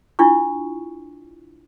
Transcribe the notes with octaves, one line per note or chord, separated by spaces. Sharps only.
D4 E4 F4 C#6